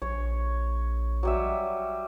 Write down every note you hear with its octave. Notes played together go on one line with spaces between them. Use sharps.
A#1 C#5
F#3 G3 E5